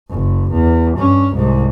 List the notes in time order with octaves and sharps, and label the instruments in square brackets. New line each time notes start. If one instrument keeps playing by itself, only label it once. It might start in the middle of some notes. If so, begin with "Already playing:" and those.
[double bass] F#1
E2
G2 C#4
C2 G#2